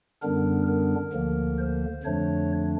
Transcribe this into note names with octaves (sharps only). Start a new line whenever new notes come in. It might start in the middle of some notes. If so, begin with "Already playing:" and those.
F#2 D3 G3 B3 D4 A#4
A#4
D2 D3 F3 A#3
C5
F2 D3 F3 A3 D4 C#5